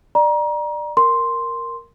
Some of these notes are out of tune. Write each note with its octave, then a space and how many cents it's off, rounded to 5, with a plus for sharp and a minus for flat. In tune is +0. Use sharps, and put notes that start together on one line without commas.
D5 +25 A#5 +30
A#4 +0 C6 +0